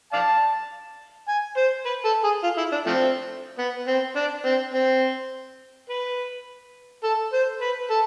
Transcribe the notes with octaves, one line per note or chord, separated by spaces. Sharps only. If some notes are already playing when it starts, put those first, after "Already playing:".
D5 F5 A5
G#5
C5
B4
A4
G#4
F4
E4
D4
F3 A3 C4
B3
C4
D4
C4
C4
B4
A4
C5
B4
A4